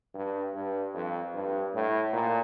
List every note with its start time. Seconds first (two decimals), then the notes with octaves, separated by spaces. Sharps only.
0.15 G2
0.55 G2
0.94 F2
1.34 G2
1.74 A2
2.13 A#2